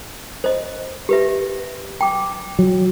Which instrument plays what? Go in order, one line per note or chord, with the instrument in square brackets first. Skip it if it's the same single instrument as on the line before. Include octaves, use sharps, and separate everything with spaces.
[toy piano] C5 D#5
G4 B4 E5
G5 D6
[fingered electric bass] F#3